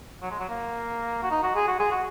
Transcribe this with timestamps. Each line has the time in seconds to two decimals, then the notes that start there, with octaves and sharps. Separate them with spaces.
0.21 F#3
0.30 G#3
0.40 F#3
0.49 A#3
1.22 F#4
1.31 D#4
1.42 F#4
1.55 G#4
1.67 F#4
1.79 G#4
1.91 F#4